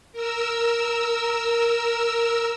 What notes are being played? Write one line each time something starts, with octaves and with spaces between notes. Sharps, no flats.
A#4 E6